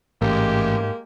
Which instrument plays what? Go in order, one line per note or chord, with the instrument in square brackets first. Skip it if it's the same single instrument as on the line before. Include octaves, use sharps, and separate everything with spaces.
[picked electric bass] A1 [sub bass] G#2 [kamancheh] G#3 G4 [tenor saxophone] A#3